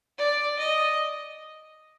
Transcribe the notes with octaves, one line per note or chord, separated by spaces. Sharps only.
D5
D#5